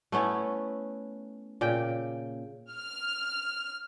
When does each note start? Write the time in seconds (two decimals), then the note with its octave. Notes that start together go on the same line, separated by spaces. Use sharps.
0.12 A3 B3 C#4 E4
1.61 A#2 C#3 G5
2.73 F6